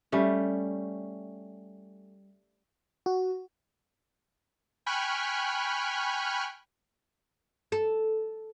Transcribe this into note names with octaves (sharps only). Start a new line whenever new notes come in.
G3 A3 C#4
F#4
G5 G#5 B5 C#6 F6 F#6
A4